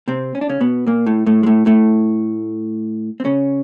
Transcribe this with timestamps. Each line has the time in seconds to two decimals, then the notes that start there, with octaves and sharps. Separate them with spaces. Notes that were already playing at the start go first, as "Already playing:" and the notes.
0.08 C3 C4
0.35 C#4
0.41 D4
0.49 C#3 C#4
0.61 B2 B3
0.87 A#2 A#3
1.06 A2 A3
1.26 A2 A3
1.43 G#3
1.46 A2 A3
1.66 A2 A3
3.20 C4
3.25 C#3 C#4